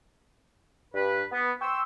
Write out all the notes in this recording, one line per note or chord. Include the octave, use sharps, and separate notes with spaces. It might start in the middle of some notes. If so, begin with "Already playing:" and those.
G2 B4
B3
G5 C6 C#6 E6